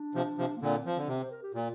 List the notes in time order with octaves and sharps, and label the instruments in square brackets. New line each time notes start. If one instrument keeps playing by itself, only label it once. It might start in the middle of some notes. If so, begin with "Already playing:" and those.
Already playing: [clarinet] D4
[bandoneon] C3 F3
C3 F3
[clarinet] A#3
[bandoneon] A#2 D3 [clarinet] C4
[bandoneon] F3
D3
C3
[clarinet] C5
A#4
G4
[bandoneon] A#2 [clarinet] F4